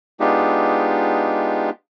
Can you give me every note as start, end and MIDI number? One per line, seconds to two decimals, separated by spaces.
0.20 1.70 56
0.20 1.70 59
0.20 1.70 62
0.20 1.70 63
0.20 1.70 65
0.20 1.70 67